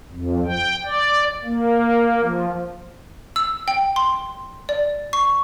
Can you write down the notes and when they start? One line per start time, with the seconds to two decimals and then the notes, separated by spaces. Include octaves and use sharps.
0.12 F2
0.46 G5
0.85 D5
1.45 A#3
2.21 F3
3.36 E6
3.68 G5
3.96 C6
4.69 D5
5.13 C#6